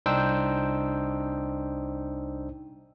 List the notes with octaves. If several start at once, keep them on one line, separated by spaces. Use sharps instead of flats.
C2 D4 D#4 C5 G5 E6